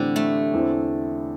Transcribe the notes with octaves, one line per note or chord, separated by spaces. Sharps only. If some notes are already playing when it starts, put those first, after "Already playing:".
Already playing: A2 D3 E3 C4 E4 G4
A3
E2 E3 C4